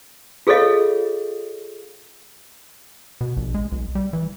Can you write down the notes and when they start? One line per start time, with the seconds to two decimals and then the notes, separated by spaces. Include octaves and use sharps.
0.47 F4 G#4 A4 C#5 D#5 F5
3.21 B2
3.37 A#1
3.54 G#3
3.72 B1
3.95 G3
4.13 E3